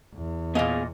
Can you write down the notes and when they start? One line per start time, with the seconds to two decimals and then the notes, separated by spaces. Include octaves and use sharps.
0.14 E2
0.55 A#2 B3 G#4 D#5 F5